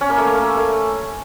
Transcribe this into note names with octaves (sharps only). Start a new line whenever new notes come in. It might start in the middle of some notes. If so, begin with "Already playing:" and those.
C#4
A#3
A3
A#3
A3